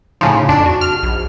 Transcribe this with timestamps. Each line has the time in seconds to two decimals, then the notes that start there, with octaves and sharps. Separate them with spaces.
0.21 A2 C#3 F3 D#4
0.49 F2 D4
0.66 F#4
0.81 F6
1.03 A#1